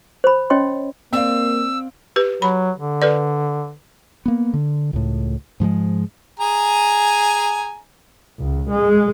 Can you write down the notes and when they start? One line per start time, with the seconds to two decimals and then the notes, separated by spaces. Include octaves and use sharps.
0.24 C5 B5
0.50 C#4 C#5 D#5 G5 C6
1.13 A#3 C4 D5 F5 E6
2.16 G4 B4
2.42 F#3 B5
2.78 D3
3.02 A4 B4 D5
4.26 A#3 B3
4.54 D3
4.93 C#2 A2
5.60 G#2 F3 G3 G#3
6.40 G#4 G#5 A#5
8.39 C#2
8.70 G#3